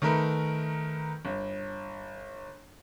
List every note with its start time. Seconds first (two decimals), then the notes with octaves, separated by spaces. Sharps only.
0.02 D#3 A3 A#4 B4
1.25 G1